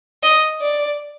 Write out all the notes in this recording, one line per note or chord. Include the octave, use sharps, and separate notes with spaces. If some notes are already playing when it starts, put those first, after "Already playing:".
D#5
D5